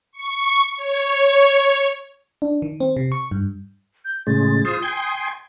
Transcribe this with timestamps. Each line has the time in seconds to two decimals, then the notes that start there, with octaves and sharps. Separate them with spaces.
0.12 C#6
0.76 C#5
2.42 D4
2.62 D#3
2.80 C4
2.97 C3
3.12 C#6
3.31 G2
4.05 G6
4.27 A2 C#3 G#3 A6
4.65 F4 G#4 C5 D#6
4.82 G5 G#5 C6